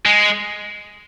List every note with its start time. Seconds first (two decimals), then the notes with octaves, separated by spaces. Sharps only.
0.05 G#3